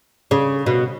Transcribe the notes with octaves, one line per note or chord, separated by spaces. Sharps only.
C#3
B2